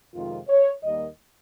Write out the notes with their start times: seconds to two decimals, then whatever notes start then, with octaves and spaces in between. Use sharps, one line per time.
0.14 F2 C3 D#3 G#3 F4
0.48 C#5
0.82 D#2 D#3 G3 A#3 D#5